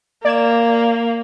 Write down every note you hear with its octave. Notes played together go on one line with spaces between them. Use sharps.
A#3 D5 G#6 E7